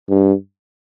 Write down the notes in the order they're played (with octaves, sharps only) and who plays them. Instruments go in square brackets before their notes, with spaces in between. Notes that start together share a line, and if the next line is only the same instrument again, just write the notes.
[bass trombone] G2